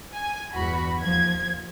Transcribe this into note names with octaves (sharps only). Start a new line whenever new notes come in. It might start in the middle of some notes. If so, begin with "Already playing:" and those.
G#5
E2 G2 F#4 B5
D#2 F3 G#6